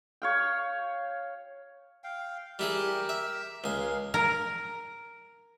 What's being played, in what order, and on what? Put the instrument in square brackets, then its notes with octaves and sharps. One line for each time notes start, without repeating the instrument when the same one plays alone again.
[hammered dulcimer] C#5 F5 G5
[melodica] F5 G5
[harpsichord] G3 E4 G#4 [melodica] G4 A#4
[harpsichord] E5
[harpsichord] C#2 G#5 [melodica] G#4 A#4 F5
[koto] A#4